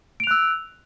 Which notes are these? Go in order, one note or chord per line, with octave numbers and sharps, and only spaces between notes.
E6 F#6 D7 F7